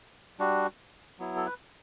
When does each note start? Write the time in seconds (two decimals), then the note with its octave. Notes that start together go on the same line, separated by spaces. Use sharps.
0.39 G3 D4 F#4
1.19 F#3 B3 E4
1.36 A4
1.46 B4